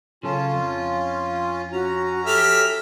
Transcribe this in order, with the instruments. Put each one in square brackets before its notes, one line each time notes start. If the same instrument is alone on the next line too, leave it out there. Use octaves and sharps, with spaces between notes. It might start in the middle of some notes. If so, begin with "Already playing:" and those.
[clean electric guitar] C#3 F#3 A4 [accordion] C#4 F4
[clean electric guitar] F2
[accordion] C#4 A#5 [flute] F#4
[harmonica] G4 E5 F6 [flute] A4